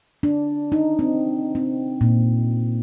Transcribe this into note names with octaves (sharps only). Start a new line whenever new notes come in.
D4
D#4
C4
C4
A#2